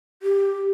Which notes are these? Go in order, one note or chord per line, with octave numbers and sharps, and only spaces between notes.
G4